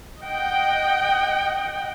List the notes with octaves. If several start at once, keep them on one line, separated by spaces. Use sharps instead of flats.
D#5 F#5 G5